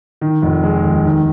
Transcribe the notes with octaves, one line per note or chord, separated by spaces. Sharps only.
D#3
F1
G#3
D#2
D#3